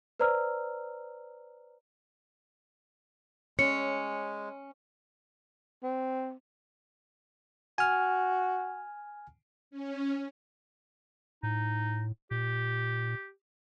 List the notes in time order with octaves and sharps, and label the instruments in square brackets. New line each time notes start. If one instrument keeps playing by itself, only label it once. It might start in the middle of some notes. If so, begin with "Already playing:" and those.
[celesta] B4 C5 D5 A#5 E6 F6
[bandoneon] G#3 [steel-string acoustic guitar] C#4 [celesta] C#7
[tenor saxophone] C4
[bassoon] F#4 [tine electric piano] G#5 F6
[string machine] C#4
[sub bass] A2 [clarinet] D#4
[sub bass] A#2 [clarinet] G4